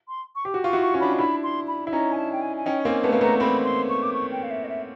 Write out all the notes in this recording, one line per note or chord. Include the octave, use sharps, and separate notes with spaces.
C6
C#6
G4 D6
F#4
F4 C#6
E4 F#4
C#6
C#4
D4 B5
D#4
D4 E4 B5
C6
B5
E4
C#4 D#4 A#5
G#5
A5
G5
G#5
G#5
C#4 D#4 G5
A#3 C4 G#5
A3 B3 A5
A#3
A3 B3 A#5
B3
A#3 C4 B5
C6
C#6
D6
C#6
G5
F5
E5
D#5
E5